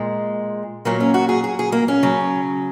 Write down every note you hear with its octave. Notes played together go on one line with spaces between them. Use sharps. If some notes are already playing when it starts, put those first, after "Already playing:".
Already playing: A#2 G#3
A#2 F#3 A#3
C#4
F#4
G#4
G#4
G#4
A#3
C#4
C#3 F#3